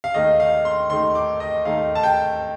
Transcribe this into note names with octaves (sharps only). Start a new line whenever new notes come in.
F5
D#2 D#3 A3 D#4 D#5
F5
C6
D#2 D#3 A3 D#4 C6
D6
D#5
D#2 D#3 A3 D#4 F5
A5
G5